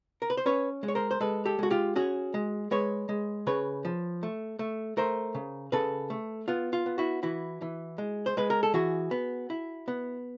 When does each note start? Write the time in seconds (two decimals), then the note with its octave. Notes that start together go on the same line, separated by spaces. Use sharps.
0.22 A#4
0.30 B4
0.37 C5
0.46 C#4 B4 C#5
0.83 G#3
0.88 C#5
0.95 A#4 C5
1.11 C5
1.21 G#3 A4 B4
1.45 G4 A4
1.59 G#3 F#4
1.71 F4 G4
1.96 C#4 F#4 G#4
2.34 G#3
2.71 G#3 B4 C#5
3.09 G#3
3.47 C#3 B4 C#5
3.85 F3
4.23 A3
4.59 A3
4.97 A3 A#4 C5
5.35 C#3
5.72 C#3 A4 B4
6.10 A3
6.48 B3 F4
6.73 F4
6.86 B3
6.98 E4 F#4
7.23 E3 E4 F#4
7.62 E3
7.98 G#3
8.26 C5
8.37 G#3 B4
8.50 A#4
8.63 A4
8.74 E3 F#4 G#4
9.11 B3
9.50 E4
9.88 B3